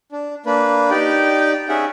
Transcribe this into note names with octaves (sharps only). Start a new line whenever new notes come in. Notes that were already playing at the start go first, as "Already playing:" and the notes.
D4
A#3 D4 B4
D#4 G4 D5 G5
C#4 D#4 G#4 E5 F#5